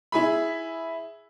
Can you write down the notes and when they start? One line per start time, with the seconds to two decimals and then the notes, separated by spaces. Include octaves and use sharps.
0.12 E4 G#4 B5